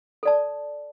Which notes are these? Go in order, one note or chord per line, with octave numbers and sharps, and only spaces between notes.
A4 D5 A5